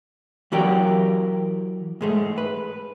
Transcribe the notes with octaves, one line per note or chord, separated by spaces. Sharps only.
E3 F#3 F#4 G4 A#4 G5
G#2 G#3 A3
B4